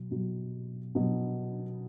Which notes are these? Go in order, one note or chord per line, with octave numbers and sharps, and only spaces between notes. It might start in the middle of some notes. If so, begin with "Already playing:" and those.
Already playing: B2 F#3
B2 F#3
B2 F#3